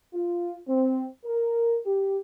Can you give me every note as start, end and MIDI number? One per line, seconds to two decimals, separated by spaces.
0.13 0.57 65
0.67 1.06 60
1.25 1.77 70
1.86 2.18 67